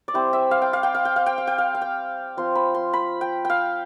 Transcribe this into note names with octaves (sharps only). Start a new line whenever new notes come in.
D5
G3 C4 E4 C5
E5
F5
G5
F5
G5
F5
G5
F5
G5
F5
G5
F5
F5
G5
F3 C4 F4 C6
B5
C6
B5
G5
F5 G5